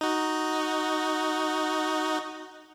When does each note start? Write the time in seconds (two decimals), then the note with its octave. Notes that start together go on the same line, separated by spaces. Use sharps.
0.01 D#4 F#4